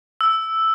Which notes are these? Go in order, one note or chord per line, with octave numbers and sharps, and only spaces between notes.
E6